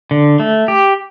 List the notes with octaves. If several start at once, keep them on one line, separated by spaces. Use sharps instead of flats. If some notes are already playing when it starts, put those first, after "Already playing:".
D3
A3
G4